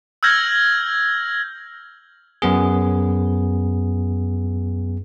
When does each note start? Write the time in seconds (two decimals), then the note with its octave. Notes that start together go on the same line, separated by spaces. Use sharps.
0.23 E6 F6 G6 G#6 A#6 F#7
2.42 F#2 B3 G#4